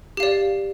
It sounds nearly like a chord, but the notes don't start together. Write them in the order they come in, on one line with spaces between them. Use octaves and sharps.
G4 F5 D5